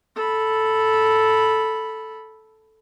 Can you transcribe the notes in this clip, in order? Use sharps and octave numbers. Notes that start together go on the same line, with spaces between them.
A4 B5